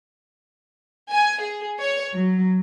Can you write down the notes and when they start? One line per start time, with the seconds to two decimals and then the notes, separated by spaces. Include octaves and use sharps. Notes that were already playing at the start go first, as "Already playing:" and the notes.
1.11 G#5
1.42 G#4
1.79 C#5
2.14 F#3